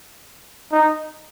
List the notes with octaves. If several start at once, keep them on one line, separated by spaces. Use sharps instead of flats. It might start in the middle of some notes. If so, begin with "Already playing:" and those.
D#4